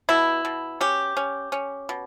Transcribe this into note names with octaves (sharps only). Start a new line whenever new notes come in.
B2 E4
B2
C#4 G4
C#4
C#4
B2